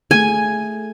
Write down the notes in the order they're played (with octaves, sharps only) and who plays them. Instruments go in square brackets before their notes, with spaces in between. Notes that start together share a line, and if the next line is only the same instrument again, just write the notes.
[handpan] A3 G#4 [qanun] G#5